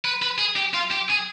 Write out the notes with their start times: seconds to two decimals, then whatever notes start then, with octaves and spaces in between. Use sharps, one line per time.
0.05 B4
0.22 B4
0.39 G#4
0.56 G4
0.73 F4
0.90 G4
1.09 G#4